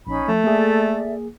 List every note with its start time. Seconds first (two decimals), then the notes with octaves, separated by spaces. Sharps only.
0.07 A#1 C#4 D#4 B5
0.28 F3 A3
0.44 A#3 G#4 A4 D5 E5